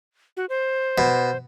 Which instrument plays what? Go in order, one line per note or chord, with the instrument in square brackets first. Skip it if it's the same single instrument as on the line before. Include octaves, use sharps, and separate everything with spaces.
[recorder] F#4
C5
[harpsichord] B2